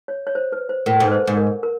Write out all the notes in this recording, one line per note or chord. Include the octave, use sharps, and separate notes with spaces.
C#5
C#5
C5
B4
C5
A2 A#4
G#2
B4
C5
G#2
A#4
A#4